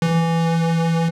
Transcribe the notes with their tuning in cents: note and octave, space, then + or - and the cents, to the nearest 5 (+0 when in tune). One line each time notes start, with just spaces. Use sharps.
E3 +10